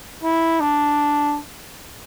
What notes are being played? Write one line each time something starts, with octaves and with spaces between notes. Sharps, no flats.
E4
D4